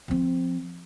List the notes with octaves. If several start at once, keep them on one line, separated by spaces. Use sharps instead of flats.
F3 C4